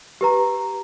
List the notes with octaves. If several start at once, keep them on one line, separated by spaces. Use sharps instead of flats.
G4 B4 A#5